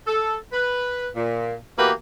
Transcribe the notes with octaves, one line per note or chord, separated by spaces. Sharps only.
A4
B4
A#2
E3 A#3 B3 F#4 G4 B4